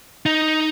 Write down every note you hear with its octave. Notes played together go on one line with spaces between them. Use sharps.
D#4